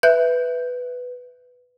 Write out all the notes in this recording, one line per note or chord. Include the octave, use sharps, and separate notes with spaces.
B4 E5 F#6 G6